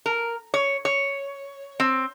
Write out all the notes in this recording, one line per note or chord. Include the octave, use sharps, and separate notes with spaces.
A#4
C#5
C#5
C4